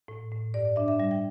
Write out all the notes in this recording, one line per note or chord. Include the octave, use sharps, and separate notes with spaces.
A2
A2
G2 D5
D5
D4 E5
E5
G3 E5
G5